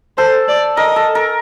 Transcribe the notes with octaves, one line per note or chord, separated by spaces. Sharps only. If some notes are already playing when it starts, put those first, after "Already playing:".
A4 C5
D5
A#4 D#5
A4
A#4